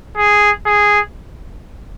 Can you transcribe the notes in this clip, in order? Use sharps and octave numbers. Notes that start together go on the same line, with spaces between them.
G#4
G#4